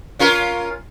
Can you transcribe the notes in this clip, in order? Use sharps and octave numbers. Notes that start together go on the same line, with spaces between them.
C#4 F4 A#4